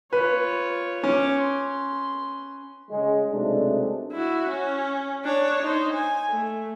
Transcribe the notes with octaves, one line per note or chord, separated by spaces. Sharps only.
F4 B4 C#5
C#4 C#5 D6
C6
C#3 G#3
B1 C3 G#3 A3 D4
E4 F#4
C#4
D4 C#5
D#4 C5
G#5
A3